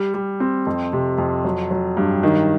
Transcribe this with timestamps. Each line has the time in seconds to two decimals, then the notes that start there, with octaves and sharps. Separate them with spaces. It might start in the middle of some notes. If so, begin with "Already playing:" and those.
Already playing: G3
0.14 G3
0.40 C4
0.66 F2
0.93 C3
1.18 F2
1.45 F#3
1.71 F#3
1.97 G2
2.23 D#3